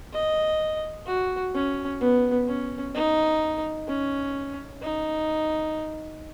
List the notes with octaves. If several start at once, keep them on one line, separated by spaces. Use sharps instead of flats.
D#5
F#4
C#4
B3
C#4
D#4
C#4
D#4